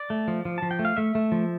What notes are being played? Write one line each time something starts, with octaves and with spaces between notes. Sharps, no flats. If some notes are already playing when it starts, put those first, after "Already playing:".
Already playing: D5
A3
F3
F3
F3 A5
G5
A3
F5
A3 E5
A3
F3